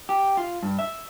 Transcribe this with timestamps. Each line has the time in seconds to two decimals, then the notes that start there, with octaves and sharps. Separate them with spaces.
0.09 G4
0.37 F4
0.63 G2
0.79 E5